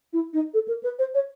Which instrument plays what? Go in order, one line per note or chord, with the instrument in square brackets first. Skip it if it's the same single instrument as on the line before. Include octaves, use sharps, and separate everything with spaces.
[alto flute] E4
D#4
A4
A#4
B4
C5
C#5